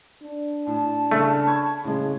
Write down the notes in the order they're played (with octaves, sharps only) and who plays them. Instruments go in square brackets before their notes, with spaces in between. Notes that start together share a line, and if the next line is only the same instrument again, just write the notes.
[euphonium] D4
[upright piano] A2 [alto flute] A5
[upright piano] C#3 [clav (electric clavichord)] A3
[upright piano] B5 C#6 G#6
[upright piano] A2 G#3 [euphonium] C#3